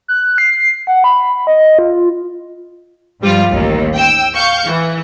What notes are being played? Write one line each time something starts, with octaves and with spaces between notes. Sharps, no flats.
F#6
C7
F#5
B5
D#5
F4
G2 F3 G3 F4
A1 D#2
G5 E6
F5 C#6 G6
E3